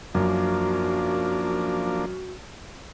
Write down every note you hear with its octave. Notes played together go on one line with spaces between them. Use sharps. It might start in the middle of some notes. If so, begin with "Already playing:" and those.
F#2 F3 A#3 D4 F#4